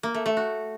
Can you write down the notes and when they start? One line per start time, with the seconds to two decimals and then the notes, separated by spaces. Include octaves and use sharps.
0.03 A#3
0.14 A3
0.26 A3
0.37 F#4